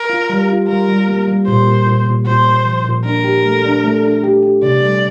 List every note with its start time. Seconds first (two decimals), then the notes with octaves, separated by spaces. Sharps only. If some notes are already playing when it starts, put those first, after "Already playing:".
Already playing: A#4
0.10 F4
0.30 G3
0.48 F4
0.68 G3 A#4
0.88 G3
1.08 A#3
1.27 G3
1.47 A#2 C5
1.67 A#2
1.87 A#2
2.06 A#2
2.26 A#2 C5
2.46 A#2
2.65 F3
2.85 A#2
3.04 D4 A#4
3.24 G4
3.45 A3
3.64 D4
3.84 A3
4.03 D4
4.24 G4
4.43 G4
4.62 C3 D5
4.82 G3